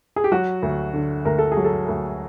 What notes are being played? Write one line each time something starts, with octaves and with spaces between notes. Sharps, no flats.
G#4
G4
F#3 F#4
D2
D3
D2 A#4
A4
F#3 G#4
A4
D2